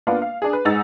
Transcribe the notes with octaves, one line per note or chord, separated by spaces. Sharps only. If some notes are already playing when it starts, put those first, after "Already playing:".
A#3 B3 D4 F4
F5
D4 G#4
B4
G#2 D#4 G#4 F#5 E6 A6